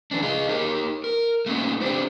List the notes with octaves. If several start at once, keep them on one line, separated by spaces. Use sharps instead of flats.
D3 E3 C#4 D4
G#4 D#5 F5
D#4 G4 A#4
A#4
A3 A#3 C#4 D#4
B3 C4 D4 G4